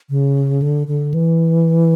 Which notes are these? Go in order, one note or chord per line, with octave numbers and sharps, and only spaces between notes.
C#3
D3
D3
E3